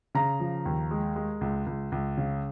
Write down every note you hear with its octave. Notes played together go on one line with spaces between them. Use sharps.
C#3 A#5
F3
D#2
G#3
G#3
C#2
C#2
C#2
C#3